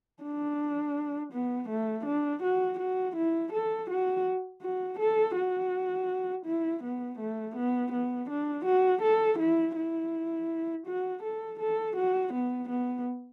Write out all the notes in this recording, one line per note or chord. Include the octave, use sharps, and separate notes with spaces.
D4
B3
A3
D4
F#4
F#4
E4
A4
F#4
F#4
A4
F#4
E4
B3
A3
B3
B3
D4
F#4
A4
E4
E4
F#4
A4
A4
F#4
B3
B3